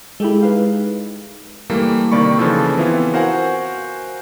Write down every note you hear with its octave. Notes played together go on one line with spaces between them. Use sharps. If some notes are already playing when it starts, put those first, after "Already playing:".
G#3 E4 G4 A4
D#4 B4 F5
E3 G3 A3 A#3
C3 D#3 A#3 D5 B5 C#6
C#3 E3 F3 F4 A4
E3 B3 C4 E4 F4
F#4 A#4 C5 F5 F#5 G#5